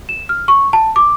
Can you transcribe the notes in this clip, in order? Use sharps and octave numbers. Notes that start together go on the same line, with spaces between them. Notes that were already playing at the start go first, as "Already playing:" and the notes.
E7
F6
C#6
A5
D6